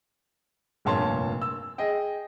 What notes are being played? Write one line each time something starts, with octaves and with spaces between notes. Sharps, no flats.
F1 G2 A#2 C#5 A5 C6
E6
G#4 D#5 G5